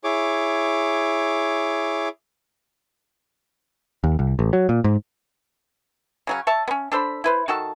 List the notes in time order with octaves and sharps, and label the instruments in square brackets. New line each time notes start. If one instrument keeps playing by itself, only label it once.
[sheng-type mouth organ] E4 G#4 C#5 D6
[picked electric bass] D#2
C2
A1
F#3
A#2
G#2
[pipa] C#3 F#3 C#4
C#5 E5 A5
B3 C#4
D4 A4 C5 B5
E4 B4 C5
D#3 F#4 A4 A5